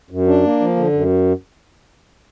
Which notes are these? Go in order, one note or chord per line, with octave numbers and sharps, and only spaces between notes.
F#2
D4
A#3
F3
D3
F#2